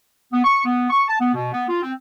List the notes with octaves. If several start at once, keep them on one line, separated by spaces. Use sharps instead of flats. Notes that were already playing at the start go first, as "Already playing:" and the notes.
B3
C#6
B3
C#6
A5
B3
B2
B3
F4
C4